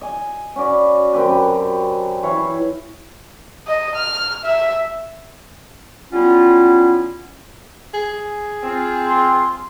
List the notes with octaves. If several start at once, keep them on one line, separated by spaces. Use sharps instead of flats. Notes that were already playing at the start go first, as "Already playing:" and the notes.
D#5 G#5
C#4 F#4 B4 D5
F#2 C4 G4 B4
E3 E4 C#5 F5
D#5
F6
E5
F#3 G3 B3 C#4 E4 F4
G#4
C4 F4
C6